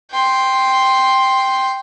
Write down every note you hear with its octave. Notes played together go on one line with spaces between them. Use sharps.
G5 C6